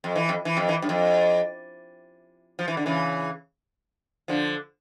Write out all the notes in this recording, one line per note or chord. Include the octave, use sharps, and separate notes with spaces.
F2
E3
F2
E3
F2
E3
G2
F2
F3
E3
D3
C#3 E3
D3 F3